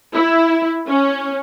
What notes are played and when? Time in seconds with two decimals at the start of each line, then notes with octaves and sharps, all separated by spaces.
0.14 E4
0.87 C#4